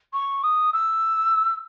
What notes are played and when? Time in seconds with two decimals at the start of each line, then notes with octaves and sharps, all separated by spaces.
0.13 C#6
0.43 D#6
0.73 E6